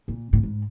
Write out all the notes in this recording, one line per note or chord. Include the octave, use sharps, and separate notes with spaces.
A#2
A2
G#2